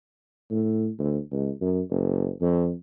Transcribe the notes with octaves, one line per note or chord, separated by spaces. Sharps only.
A2
D2
C#2
F#2
F#1
F2